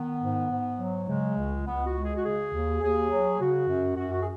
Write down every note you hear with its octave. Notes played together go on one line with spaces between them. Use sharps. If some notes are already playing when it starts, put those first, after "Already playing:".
Already playing: D#3 B3
G#2
G#2
F#3
C#3 G#3
C#2
C#2 B3
F#4
G#3
G#4
F#4
C#3 G#4
D#2
D#2 G#4
F#3
C#3 F#4
F#2
F#2 F#4
F#4
G#4